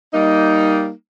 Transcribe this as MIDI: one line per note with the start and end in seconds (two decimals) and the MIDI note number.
0.13 0.90 55
0.13 0.90 58
0.13 0.90 63